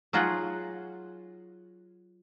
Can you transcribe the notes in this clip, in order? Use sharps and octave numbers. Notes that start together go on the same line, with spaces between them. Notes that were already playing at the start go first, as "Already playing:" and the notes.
F#3 D#4 F4 G#4 D#5 F#5